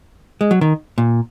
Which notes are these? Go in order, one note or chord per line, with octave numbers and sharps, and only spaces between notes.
G#3
F#3
D#3
A#2